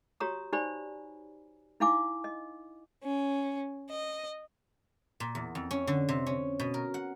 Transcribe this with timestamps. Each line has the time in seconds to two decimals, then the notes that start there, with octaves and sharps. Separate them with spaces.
0.20 F#4 G4 C#5 A#5 D#6
0.53 D#4 G4 C5 D5 G#5 B5
1.80 D#4 E4 F5 G#5 D6
2.24 D#5
3.04 C#4
3.90 D#5
5.20 A#2
5.35 E2
5.55 F2
5.71 C#4
5.87 D3
6.09 C3
6.26 C#4
6.60 B2
6.74 A#4
6.94 F#5